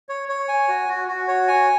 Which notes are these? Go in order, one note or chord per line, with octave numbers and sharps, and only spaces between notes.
C#5
C#5
G#5
F#4
F#4
F#4
C#5
G#5